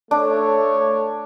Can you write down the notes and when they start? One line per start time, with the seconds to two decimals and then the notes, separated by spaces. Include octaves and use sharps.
0.11 A3 D4 A4 C#5